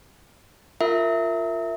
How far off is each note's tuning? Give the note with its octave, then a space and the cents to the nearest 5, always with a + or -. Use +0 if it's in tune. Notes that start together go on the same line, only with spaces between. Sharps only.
F4 +0 A#4 -20 E5 +0